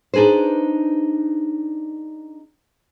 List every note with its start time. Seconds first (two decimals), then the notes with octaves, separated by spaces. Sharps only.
0.14 D4 D#4 G#4 B4 C5